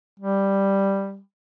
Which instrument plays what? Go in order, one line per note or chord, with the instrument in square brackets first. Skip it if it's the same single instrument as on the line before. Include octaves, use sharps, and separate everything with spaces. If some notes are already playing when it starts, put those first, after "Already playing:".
[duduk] G3